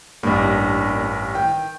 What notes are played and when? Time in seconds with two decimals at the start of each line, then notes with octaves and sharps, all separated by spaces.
0.23 A1 G2 A#3 D4
1.35 D#3 G5